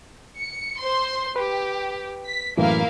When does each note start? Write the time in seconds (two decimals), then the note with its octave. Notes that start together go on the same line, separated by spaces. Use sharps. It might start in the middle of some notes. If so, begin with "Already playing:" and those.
0.38 C#7
0.80 C5 C6
1.36 G4 B4
2.26 B6
2.57 F#2 A2 E3 A#3 E4 F5